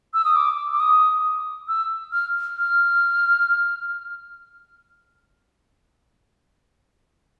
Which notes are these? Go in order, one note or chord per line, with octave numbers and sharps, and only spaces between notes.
E6
D#6
D6
D6
D#6
E6
F6
F6